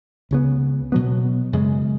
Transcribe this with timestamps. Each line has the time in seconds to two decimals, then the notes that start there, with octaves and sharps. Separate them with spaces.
0.31 C#2 C#3 B3
0.92 B2 F#3 B3
1.53 F#2 C#3 G#3